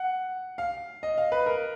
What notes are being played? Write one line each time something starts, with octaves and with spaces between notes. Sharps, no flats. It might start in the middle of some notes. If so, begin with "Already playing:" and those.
Already playing: F#5
F5
D#5
F5
B4
A#4